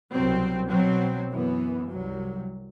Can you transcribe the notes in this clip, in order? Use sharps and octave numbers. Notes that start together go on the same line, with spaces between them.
C2 B2 F#3 C4
B2 F#3 C4
F#2 E3 B3
C2 C3 F#3